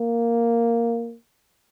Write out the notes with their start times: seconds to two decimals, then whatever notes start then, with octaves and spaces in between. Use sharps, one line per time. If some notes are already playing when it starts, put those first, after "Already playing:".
Already playing: A#3